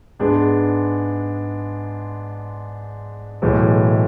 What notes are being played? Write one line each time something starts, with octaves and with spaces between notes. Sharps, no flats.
G#2 G#3 B3 D4
B1 A2 E3 G#3